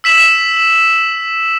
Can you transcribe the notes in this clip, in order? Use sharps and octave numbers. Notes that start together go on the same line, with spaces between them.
E6 B6 E7 F#7